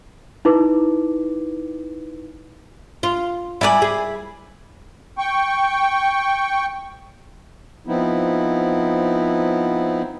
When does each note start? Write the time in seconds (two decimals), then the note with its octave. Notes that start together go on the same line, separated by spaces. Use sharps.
0.45 D#4 E4 B4 D6
3.03 F4
3.61 G3 E4 D5 G#5 B5
3.82 G#4
5.18 G5 C#6
7.87 F3 B3 C4 D#4 E4